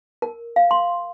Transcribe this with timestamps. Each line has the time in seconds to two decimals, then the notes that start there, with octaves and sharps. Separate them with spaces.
0.22 A#4
0.56 F5
0.71 C6